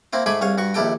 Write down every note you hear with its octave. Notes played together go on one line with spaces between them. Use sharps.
A#3 C4 E4 C5
G#2 A3 G#4 G#5 B5 D6
C2 G#4 C#5 F5
G2 F#4 C#6
A#1 D#2 E4 G4 A4 G5